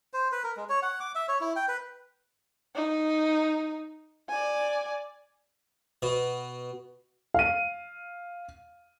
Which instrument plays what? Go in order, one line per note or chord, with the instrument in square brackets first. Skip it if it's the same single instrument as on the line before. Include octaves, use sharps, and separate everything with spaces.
[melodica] C5
B4
A#4
G#3
C#5
F#5
D6
E5
C#5
E4
G5
B4
[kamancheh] D#4
D5 G#5
[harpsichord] B2
[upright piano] F5 D#7